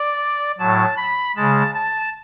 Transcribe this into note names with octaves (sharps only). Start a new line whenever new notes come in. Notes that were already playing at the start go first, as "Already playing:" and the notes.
Already playing: D5
A2 F#3 A5
B5
C#3 G#3 A5
A5